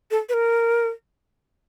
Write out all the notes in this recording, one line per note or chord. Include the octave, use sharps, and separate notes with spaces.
A4
B4
A#4